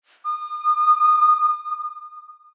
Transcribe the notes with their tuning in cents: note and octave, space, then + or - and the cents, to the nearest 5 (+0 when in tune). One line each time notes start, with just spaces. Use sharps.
D#6 -30